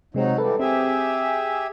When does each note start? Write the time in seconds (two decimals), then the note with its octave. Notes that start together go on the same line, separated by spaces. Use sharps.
0.14 C3 F#3 G#3 C4 D#4
0.38 E3 G3 A4 B4
0.59 C4 G4 G#4 E5